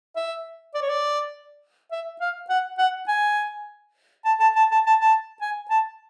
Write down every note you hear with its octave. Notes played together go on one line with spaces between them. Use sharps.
E5
D5
C#5
D5
E5
F5
F#5
F#5
G#5
A5
A5
A5
A5
A5
A5
G#5
A5